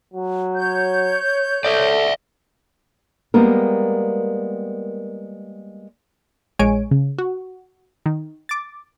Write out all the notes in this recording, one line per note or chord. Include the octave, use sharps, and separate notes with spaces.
F#3
C#5 G6
A4 D5 E5
G3 G#3 A#3 B3 A#4
A#1 G#3 C#5 G#5 D7
C#3
F#4
D#3
D6 A6